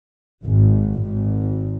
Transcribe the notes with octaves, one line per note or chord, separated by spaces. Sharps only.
G#1
G#1